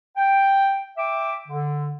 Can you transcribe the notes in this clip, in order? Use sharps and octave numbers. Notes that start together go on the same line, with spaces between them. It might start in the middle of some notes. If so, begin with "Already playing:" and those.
G5
E5 G5 D6
D3